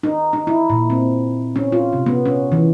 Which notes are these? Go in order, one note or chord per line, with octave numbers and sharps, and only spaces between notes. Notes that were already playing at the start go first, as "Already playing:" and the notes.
D#4
D#4
E4
A#2
C4
C#4
F4
C3
B3
C#4
E3